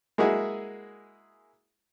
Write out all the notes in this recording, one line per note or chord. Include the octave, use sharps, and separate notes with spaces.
G#3 A#3 E4 F#4 G#4